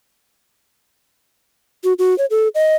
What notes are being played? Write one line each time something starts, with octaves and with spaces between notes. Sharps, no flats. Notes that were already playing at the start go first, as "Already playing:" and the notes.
F#4
F#4
C#5
A4
D#5